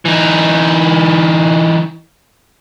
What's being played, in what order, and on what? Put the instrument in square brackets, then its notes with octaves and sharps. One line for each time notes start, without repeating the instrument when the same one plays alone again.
[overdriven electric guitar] E3 D#4